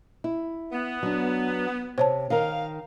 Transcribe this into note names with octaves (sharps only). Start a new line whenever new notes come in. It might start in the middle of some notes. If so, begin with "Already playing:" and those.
E4
B3
F#3 D4
C3 C5 C#5 A5
D#3 A#4 F5